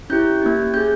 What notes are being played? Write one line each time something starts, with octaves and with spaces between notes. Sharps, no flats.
C#4 E4 G4 G6
A#3 C#4 G4
C#4 G#4 G6